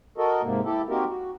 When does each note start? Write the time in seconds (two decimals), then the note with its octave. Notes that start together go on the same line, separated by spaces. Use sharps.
0.18 F#4 A4 A#4 D#5
0.43 G#2 C3 A#3
0.64 E4 G4 A4
0.89 A#3 C4 D#4 F#4 G4 A#4
1.08 F#4